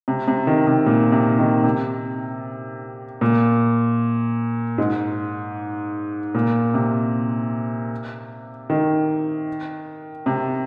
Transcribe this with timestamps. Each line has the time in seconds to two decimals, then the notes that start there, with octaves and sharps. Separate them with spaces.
0.08 C3
0.28 C3
0.47 D#3
0.67 C3
0.86 A#2
1.12 C3
1.39 D#3
1.64 C3
3.21 A#2
4.78 G#2
6.35 A#2
6.74 C3
8.70 D#3
10.26 C3